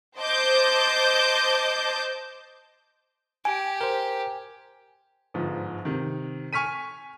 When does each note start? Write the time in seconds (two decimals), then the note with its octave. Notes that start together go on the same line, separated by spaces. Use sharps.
0.18 C5 D#5 A5 D6 G6
3.45 G4 G#5
3.81 A#4 C5
5.34 G1 G#2 F3
5.85 C3 D#3
6.53 G#5 C#6 F6 B6 D#7